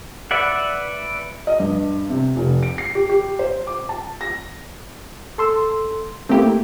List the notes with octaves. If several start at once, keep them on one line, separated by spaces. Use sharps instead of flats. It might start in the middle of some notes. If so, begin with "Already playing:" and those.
B4 D5 E5 F#5
D#5
G2
C3
F1
D7
C7
G4
G4
C5
D6
A5
A#6
A4 C6 E6
A3 A#3 C4 E4 G4